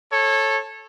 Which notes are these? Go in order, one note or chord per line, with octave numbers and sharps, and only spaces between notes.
A4 C#5